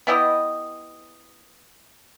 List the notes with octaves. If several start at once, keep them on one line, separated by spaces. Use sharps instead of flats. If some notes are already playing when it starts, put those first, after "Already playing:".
B3 E4 G4 D#5